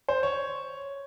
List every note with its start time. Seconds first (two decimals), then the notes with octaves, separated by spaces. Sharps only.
0.09 C5
0.23 C#5